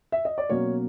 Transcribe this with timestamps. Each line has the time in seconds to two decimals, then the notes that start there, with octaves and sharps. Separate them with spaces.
0.12 E5
0.25 D#5
0.38 D5
0.50 B2 F#3 A#3 C#4 C#5